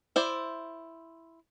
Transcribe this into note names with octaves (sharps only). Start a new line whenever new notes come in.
E4 C5 D5